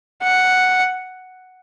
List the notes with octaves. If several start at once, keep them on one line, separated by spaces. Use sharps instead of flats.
F#5